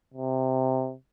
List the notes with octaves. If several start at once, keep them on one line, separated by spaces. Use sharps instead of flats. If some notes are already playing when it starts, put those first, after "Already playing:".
C3